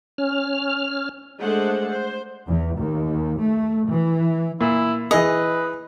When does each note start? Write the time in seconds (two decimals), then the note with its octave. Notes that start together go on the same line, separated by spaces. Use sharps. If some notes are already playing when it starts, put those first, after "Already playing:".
0.18 C#4 F6
1.40 G#3 A3 D4 A4 C5 F#5
1.91 C5
2.47 E2
2.77 D#2
3.39 A3
3.88 E3
4.61 A#2 E4
5.11 E3 G#4 B4 D#5